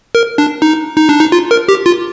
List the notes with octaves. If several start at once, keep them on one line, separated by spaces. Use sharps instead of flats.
A#4
D4
D#4
D#4
D4
D#4
F4
A#4
G4
F4